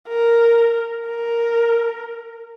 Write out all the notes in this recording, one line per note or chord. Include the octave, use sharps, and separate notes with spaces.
A#4
A#4